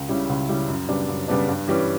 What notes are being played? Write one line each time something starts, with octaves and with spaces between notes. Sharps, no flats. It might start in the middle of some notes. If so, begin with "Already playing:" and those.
Already playing: C#2
C#3 G3 C#4 E4
C#2
C#3 G3 C#4 E4
F#2
C#3 G3 B3 D4
F#2
C#3 G3 B3 D4
G2
E3 G3 C#4